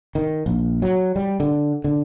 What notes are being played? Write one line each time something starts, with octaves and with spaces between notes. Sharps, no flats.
D#3
A#1
F#3
G3
D3
D3